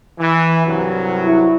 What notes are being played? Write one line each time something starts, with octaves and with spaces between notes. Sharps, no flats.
E3
C2 G2 F#3
E4